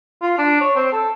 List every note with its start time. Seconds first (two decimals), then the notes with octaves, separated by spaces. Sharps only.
0.22 F4
0.38 D4
0.61 C#5
0.76 C4
0.92 A4